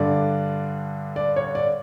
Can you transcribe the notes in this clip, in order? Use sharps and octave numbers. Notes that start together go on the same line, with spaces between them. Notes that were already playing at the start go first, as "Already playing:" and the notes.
Already playing: G2 D3 D5
D5
C#5
D5